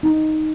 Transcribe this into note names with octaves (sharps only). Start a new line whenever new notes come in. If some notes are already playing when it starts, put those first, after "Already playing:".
D#4